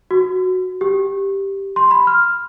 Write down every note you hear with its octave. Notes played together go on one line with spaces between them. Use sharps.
F#4
G4
C6
B5
F6